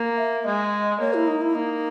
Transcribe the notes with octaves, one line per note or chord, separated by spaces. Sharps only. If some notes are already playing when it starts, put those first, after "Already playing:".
Already playing: A#3
E5
G#3 D#5
A#3 C#5
E4
D#4
E4
A#3 D#4